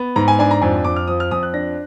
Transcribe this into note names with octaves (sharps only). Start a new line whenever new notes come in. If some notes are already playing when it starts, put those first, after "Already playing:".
Already playing: B3
G#2 A#5
G#5
D4 G#5
A#5
F2 G#5
F2 D6
F6
F3 D#6
F6
F2 D#6
F#6
D4 A#6